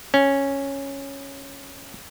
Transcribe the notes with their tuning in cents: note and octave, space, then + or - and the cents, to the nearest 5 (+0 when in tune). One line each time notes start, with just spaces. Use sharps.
C#4 -5